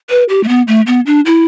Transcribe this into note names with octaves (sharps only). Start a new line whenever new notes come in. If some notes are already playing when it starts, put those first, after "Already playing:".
B4
G4
A3
B3
A3
B3
D4
E4